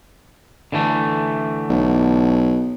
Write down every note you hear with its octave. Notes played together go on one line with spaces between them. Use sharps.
D3 E3 A3
B1